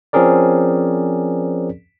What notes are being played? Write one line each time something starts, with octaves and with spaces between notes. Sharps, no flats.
F3 C4 C#4 G#4 A#4 D5